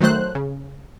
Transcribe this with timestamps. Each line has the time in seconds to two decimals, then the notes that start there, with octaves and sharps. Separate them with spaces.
0.01 D#3 F#3 A3 C5 F#6
0.35 C#3